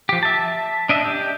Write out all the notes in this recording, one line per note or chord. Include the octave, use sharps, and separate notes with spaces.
F3 G4
E5 A5
D4 D#5 E5
G4